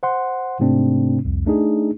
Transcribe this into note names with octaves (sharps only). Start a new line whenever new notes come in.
C5 F#5 C6
G#2 C3 A3 C4 D4
C2 F2
A3 D4 D#4 G#4